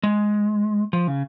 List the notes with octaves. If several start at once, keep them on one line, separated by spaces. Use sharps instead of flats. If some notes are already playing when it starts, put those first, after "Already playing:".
G#3
F3
C#3